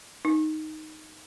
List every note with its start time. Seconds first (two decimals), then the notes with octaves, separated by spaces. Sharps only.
0.25 D#4